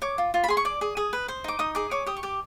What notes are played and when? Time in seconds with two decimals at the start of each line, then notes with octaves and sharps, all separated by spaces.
0.02 C#5 D6
0.18 F4
0.34 F4
0.44 B5
0.48 G#4 C6
0.57 C#6
0.65 D5 D6
0.81 G#4
0.97 G#4 D#6
1.13 B4
1.28 C5
1.44 D#4 D6
1.59 D#4 D#6
1.75 G#4 D6
1.91 C#5 D6
2.06 G4 D#6
2.17 C#6
2.23 G4 D6